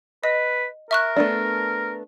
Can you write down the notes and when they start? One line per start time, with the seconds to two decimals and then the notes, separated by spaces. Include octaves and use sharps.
0.24 B4 D#5
0.91 A#4 E5 C#6 F#6
1.16 A3 B3 D4